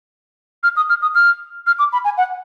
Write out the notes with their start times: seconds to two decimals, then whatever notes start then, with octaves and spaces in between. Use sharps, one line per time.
0.63 F6
0.76 D#6
0.89 F6
1.02 D#6
1.15 F6
1.67 F6
1.79 D6
1.93 B5
2.05 G#5
2.17 F#5